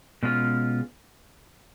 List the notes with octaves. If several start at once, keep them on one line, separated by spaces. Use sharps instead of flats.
B2 G#3 C#4 F4